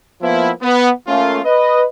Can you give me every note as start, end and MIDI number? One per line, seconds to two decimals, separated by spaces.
0.21 0.50 53
0.21 0.50 58
0.21 0.50 59
0.21 0.50 64
0.62 0.90 59
1.07 1.39 57
1.07 1.39 58
1.07 1.39 61
1.07 1.39 65
1.45 1.84 71
1.45 1.84 75